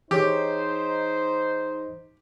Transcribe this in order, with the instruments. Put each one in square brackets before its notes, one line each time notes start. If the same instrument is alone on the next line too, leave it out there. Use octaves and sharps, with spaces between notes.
[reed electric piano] E3 G#4 C#5 [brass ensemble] D#4 C5 [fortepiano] G4